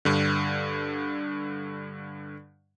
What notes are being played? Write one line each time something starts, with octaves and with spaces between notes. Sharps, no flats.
G2 D3